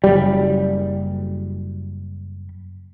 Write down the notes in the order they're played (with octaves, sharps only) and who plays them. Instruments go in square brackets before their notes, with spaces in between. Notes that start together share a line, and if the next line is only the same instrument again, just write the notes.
[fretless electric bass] F#1 G3